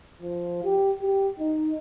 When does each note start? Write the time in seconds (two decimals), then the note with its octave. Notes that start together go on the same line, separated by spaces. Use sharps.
0.22 F3
0.64 G4
1.02 G4
1.40 D#4